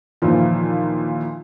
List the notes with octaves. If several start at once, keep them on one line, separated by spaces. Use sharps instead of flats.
D#2 A#2 E3 F3